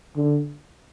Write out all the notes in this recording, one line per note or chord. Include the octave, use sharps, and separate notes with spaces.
D3